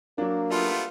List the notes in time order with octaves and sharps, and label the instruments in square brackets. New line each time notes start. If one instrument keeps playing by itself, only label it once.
[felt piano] F#3 D4 [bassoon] A#3
[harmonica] G3 A3 B3 [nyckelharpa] F4